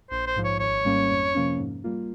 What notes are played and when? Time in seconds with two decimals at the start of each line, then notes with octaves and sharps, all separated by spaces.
0.10 A#1 C5
0.27 C5
0.36 G#2 F3
0.44 C#5
0.60 G#1 C#5
0.85 G#2 G3 A#3 C#4
1.10 F2
1.35 C3 F3 A#3 C#4
1.58 G#2
1.84 G3 A#3 F4